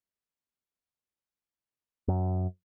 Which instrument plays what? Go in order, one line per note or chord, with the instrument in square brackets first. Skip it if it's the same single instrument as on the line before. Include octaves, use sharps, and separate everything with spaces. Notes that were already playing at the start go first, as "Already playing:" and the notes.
[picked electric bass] F#2